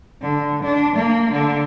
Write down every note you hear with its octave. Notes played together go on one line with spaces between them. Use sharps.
D3
D4
A#3
D3